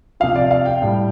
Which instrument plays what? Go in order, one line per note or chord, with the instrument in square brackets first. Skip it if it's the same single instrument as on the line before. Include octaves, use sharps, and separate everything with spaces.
[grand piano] C3 F3 F5
D5
F5
G5
A2 G3